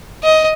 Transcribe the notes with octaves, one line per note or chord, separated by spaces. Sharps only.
D#5